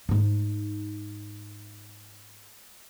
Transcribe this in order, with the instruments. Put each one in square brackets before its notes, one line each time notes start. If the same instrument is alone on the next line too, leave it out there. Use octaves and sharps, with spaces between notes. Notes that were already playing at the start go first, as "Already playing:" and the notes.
[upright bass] G#2 D#4